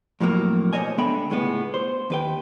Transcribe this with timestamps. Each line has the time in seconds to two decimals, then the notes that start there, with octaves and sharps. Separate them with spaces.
0.20 F2 A2 F#3 A#3
0.73 B2 G#3 C5 C#5 D#5 G#5
0.98 D3 G#3 B3 E5 G5 B5
1.30 C#2 A2 G#3 B3
1.74 C5
2.10 D#2 B4 G5